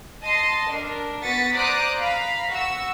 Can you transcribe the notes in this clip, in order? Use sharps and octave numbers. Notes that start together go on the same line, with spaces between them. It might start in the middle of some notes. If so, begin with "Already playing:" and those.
D#5 A5 C6 C7
D4 A#4
B3 F#4 D#6 A6 B6 C#7
C5 D5 A#5 D6 D#6 F#6
F5 A#5 B5 B6
F#4 E6